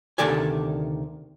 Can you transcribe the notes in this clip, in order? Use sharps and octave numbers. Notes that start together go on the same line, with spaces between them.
D2 C3 D#3 A4 D5 G#5